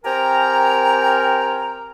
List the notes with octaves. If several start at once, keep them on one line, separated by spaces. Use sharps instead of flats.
C4 G4 A#4 G5 G#5 A#5